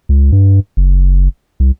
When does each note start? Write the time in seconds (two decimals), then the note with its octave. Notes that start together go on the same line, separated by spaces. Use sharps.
0.09 C#2
0.32 G2
0.77 F#1
1.60 C2